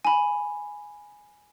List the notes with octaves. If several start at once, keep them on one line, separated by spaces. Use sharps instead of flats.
G#5 B5